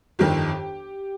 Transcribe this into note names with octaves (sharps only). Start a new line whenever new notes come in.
G1 F2 D#3 G3 G4